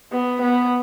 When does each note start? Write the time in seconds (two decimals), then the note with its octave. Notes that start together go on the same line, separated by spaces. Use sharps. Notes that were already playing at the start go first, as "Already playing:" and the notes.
0.12 B3
0.41 B3